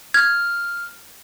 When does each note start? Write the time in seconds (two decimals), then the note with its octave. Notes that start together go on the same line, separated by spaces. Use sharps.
0.14 F6 G#6